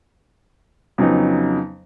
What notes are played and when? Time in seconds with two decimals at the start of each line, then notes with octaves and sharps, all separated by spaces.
0.98 F2 C#3 F#3 B3 D#4